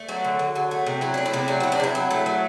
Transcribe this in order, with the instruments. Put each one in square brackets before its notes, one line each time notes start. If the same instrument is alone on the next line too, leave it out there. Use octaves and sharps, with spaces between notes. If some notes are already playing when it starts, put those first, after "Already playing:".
Already playing: [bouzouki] A3
F#3 F#4
D3
D3
F#3
A3
C3
F#3 E4
A3 D4
E4
C3
F#3 D4
C3 E4
D4
C3 E4
F#3
A3
F#3